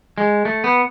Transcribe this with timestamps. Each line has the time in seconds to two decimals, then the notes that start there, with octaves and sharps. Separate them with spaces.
0.18 G#3
0.45 A3
0.64 B3